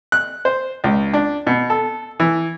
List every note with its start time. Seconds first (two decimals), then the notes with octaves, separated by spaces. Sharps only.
0.12 F#6
0.45 C5
0.84 C#2
1.13 D4
1.47 B2
1.70 A4
2.20 E3